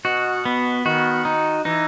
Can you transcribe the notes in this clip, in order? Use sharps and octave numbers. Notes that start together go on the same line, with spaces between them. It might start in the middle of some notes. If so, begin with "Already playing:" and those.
B2 F#4
B3
D#3 F#4
D#4
E3 D#4